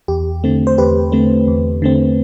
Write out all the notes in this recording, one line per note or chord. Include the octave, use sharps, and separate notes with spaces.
E2 G4
D3 A3 C4
C5
E2 G4 B4
D3 A3 C4
E2
D3 A3 C4